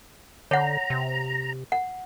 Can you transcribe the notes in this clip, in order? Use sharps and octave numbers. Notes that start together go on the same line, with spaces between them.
D3 C#5 F#5 A#5
C3
F#5